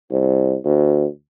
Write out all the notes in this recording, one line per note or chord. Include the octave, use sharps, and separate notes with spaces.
C2
D2